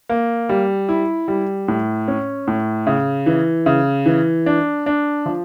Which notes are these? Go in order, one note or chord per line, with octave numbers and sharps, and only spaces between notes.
A#3
G3
E4
G3
A2
C#4
A2
C#3
E3
C#3
E3
D4
D4
F3